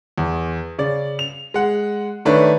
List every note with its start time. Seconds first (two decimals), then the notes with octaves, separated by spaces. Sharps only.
0.18 E2
0.79 C#3 D5
1.19 F7
1.54 G#3 F#5
2.25 D#3 A3 D4 B4 C#5